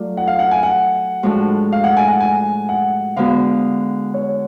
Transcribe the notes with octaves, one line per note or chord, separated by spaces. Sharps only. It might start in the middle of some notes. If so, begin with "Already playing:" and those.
Already playing: F#3 A3 F4 D5
F#5
F5
F#5
G#5
F#5
A2 F3 G#3 D4 F#4
F5
F#5
G#5
F#5
G#5
F#5
D3 G#3 B3 F#4 F5
C#5